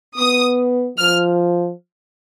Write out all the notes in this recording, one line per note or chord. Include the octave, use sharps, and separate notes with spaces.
B3 D#6
F3 F6